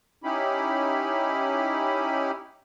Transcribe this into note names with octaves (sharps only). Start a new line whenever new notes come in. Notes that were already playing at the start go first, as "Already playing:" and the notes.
C#4 D#4 E4 G4 B5